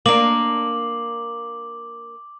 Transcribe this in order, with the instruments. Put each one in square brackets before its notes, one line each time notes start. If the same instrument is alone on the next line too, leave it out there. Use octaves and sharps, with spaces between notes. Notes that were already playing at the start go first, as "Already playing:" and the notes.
[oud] A#3 D4 [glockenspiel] D6 F#7